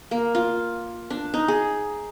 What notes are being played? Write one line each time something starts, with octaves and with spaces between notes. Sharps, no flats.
A#3
F4
D4
D#4
G#4